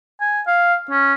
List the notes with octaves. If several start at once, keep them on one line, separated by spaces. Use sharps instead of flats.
G#5
F5
C#4